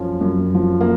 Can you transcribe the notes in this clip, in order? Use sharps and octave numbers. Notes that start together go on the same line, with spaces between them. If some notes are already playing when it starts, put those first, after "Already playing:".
Already playing: F#2 F3 C#4
F#2
F3
A#3